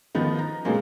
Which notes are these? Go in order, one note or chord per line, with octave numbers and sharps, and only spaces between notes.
D#3 F3 B3 D#4
A#5
A#2 D3 F#3 G#3 A#3 C4